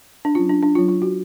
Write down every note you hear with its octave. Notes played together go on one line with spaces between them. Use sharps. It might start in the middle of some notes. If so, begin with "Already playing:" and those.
D4
F#3 C#4 F4
D4
D4
F#3 C#4 F4
F4
F#4